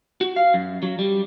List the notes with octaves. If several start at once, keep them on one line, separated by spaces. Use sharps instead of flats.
F#4
F5
F#2
F#3
G3